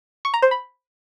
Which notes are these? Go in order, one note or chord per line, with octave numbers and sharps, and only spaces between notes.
C#6
A#5
C5
B5